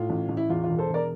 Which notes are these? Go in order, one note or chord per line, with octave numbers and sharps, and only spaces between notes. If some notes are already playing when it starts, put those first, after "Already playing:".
Already playing: A2 F4
A1
A1
E4
E2 F4
E1 F4
A4 C5
E1 A#4 D5